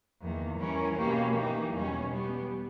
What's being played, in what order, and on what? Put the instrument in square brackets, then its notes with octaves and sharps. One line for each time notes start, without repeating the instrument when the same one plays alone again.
[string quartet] E2 D#3 A#3
E3 G3 C#4 E4 A#4
B2 A#3 C#4 G4
E3 A#3 D#4 G4
E2 B2 G3 C#4
G3 B3 G4